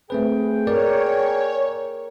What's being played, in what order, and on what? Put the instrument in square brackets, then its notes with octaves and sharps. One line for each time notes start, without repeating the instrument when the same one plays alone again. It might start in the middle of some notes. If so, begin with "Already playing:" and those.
[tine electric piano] A3 C4 B4 [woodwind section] G#4 G5
[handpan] A#4 [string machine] C#5 [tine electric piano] D5